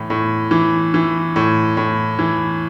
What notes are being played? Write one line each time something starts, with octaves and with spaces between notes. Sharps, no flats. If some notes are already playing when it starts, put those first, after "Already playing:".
Already playing: A2 E3
A2
E3
E3
A2
A2
E3